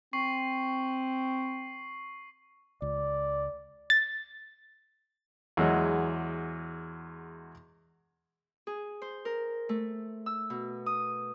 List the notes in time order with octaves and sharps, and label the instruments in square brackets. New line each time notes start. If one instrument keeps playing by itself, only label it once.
[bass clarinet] C4 [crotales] C#6 C7 F#7
[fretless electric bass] C#2 [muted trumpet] D5
[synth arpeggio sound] A6
[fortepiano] E2 F#3 G#3
[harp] G#4
C5
A#4
A3
E6
B2
D#6